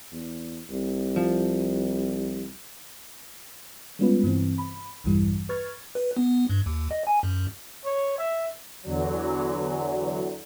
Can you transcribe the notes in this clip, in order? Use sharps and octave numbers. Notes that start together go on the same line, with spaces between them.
E2
C2
F3
G3 G#3 B3 C#4 F4 B4
G2 C3 E3 C4
B5
A#1 E2 G2 E3 G3
B4 C#6 F6 G#6 A6
B4
B3
B3
G2
D#2
D#5
G#5
F#2
C#5
E5
E2 D3 F#3